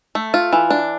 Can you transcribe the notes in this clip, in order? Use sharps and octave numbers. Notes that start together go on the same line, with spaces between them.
A3
F4
E3
D4